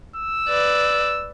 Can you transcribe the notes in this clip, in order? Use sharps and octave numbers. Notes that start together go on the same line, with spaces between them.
E6
B4 D5